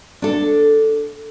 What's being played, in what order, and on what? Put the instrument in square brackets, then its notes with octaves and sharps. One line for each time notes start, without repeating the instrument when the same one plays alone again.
[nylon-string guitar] D4 A4